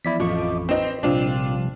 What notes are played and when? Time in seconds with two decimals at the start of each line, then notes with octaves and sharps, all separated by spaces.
0.05 E3 F3 B3 E4 D5 B6
0.20 A1 F2 F3 D#5 C#6 D6
0.69 C4 D#4 B4 C5
1.03 A#1 C3 F3 G3 C4 D4 F4